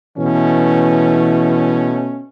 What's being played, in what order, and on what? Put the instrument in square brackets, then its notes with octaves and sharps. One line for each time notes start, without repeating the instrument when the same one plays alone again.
[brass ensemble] B2 A3 C#4 [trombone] E3